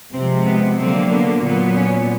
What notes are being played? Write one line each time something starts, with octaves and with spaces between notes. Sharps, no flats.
C3 F3 G#3 C4
B3
D3 F#3 A#3 C4
B3
A#2 F#3 B3
C#4